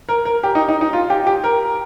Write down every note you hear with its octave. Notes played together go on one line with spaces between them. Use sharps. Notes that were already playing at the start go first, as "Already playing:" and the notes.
A#4
A#4
G4
D#4
D#4
D#4
F4
G4
G4
A#4